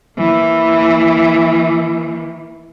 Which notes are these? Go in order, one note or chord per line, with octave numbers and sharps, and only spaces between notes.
E3 A#3